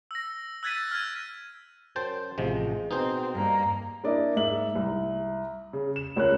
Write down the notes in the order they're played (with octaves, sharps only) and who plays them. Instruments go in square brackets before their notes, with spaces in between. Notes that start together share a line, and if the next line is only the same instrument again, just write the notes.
[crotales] E6 A#6
E6 F#6 G#6 A6 B6 D#7
F6 G#6
[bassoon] F#2 [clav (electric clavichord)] C5 G5 A5
[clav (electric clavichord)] A1 C3 F3 [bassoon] G#3
[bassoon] B2 [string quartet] C4 [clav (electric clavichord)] D#4 G#4 C5
[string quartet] G2 A#3
[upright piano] A#3 D4 E4 A#4 D5 D#5
G#2 E5 F#7
C2
C#3
E7
C#2 C#4 A#4 C#5 F#6